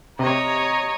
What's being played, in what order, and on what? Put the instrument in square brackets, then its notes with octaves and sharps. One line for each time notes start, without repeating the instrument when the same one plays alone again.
[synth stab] C3 [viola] C#5 D#5 [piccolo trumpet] A#5